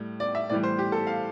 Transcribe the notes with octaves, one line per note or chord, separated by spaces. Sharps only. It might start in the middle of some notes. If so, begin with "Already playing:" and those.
Already playing: A2 G3
D5
E5
A2 E3 G3 D5
C5
G4
A4
F5